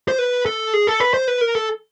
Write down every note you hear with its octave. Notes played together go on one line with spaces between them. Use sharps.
C5
B4
A4
G#4
A4
B4
C5
B4
A#4
A4